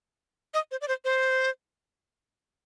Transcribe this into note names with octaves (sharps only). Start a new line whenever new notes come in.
D#5
C5
D5
C5
C5